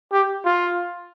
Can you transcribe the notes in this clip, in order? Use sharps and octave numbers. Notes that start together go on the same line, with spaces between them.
G4
F4